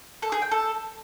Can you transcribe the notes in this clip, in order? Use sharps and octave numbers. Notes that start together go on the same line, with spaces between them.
A4
G#4
G5
A4